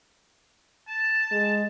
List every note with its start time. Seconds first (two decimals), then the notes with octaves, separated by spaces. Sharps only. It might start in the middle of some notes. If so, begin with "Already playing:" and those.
0.88 A5
1.31 G#3